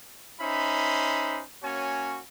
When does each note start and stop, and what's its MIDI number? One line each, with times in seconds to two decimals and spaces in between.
0.40 1.42 61
0.40 1.42 63
0.40 1.42 72
0.40 1.42 76
0.40 1.42 83
1.63 2.20 58
1.63 2.20 61
1.63 2.20 66
1.63 2.20 73
1.63 2.20 80